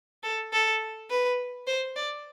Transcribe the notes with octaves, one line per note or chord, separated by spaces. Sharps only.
A4
A4
B4
C5
D5